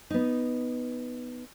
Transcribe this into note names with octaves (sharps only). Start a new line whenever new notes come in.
B3 D#4